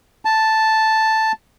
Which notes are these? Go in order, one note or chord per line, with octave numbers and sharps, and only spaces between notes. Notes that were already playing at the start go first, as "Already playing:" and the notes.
A5